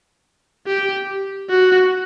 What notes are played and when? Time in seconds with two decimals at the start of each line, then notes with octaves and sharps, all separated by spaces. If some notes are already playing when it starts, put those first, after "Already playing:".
0.67 G4
1.50 F#4